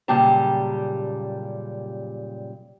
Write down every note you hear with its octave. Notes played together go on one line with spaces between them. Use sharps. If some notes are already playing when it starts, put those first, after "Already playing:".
F#2 A#2 C#3 G3 G4 A5